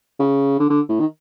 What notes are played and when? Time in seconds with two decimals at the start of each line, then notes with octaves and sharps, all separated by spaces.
0.19 C#3
0.60 D3
0.70 D3
0.89 A2
1.00 D#3